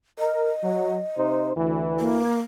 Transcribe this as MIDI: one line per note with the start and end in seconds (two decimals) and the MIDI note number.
0.19 0.54 70
0.19 1.46 75
0.63 0.99 54
1.17 1.53 48
1.17 1.53 63
1.17 1.53 72
1.56 2.24 38
1.56 2.24 52
1.99 2.40 58